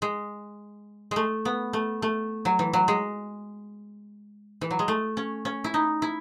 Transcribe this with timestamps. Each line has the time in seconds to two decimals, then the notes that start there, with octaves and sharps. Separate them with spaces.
0.02 G#3
1.11 G#3 A3
1.45 B3
1.73 A3
2.02 A3
2.45 F#3
2.59 E3
2.73 F#3
2.88 G#3
4.61 E3
4.71 F#3
4.79 G#3
4.88 A3
5.17 C#4
5.45 C#4
5.64 E4
5.74 D#4
6.02 E4